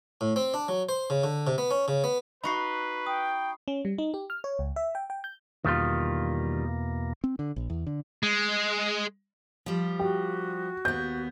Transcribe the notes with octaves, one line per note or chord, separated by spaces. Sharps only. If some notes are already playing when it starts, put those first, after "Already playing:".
A2
C4
D4
F#3
C5
C#3
D3
C3
B3
C#4
C#3
B3
D#4 F#4 B4 B5 C#6 C7
G5 D#6
C#4
G3
D#4
G4
F6
C#5
C#2
E5
G5
G5
G6
E2 B2 D#3 G3 A#3 F4
C4
D3
A#1
E2
D3
G#3
F3 G3
F#4 G4
D#2 B3 G6